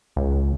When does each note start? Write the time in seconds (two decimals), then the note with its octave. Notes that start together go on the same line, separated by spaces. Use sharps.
0.16 C#2